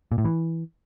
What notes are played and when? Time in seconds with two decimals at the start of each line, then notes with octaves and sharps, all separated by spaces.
0.12 A#2
0.18 A2
0.25 E3